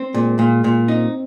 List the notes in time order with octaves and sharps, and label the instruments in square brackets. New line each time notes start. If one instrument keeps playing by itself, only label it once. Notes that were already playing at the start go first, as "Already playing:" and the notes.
Already playing: [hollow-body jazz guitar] C4
[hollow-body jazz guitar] A#2 [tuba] G#3
[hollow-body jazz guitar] A#2
A#2
[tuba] C4 [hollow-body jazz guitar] D#4